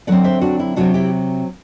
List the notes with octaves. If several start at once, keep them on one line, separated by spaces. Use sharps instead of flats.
D3 F#3 C4 D5 F#5
C5 E5
D4 F#4
E4
C3 F#3 C4 D4 F#4
E4 G4